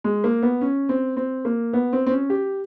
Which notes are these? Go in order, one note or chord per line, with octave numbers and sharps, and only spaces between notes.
G#3
A#3
B3
C#4
C4
C4
A#3
B3
C4
C4
C#4
G4